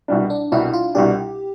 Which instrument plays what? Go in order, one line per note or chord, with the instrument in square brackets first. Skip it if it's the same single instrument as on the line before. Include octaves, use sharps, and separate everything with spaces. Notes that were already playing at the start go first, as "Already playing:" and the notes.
[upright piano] C2 B2 G3 D4
[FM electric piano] D4
[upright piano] C2 B2 G3 D4 [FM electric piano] E4
[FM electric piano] F4
[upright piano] C2 B2 G3 D4 [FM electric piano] G4